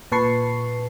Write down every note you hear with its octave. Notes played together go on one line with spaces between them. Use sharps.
A#2 B4 A5 C#6 C7